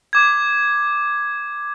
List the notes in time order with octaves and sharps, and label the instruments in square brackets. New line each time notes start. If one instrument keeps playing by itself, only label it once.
[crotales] D6 G#6